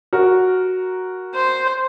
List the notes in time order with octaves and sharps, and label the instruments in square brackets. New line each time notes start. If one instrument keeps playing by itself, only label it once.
[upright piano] F#4 A#4
[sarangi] C5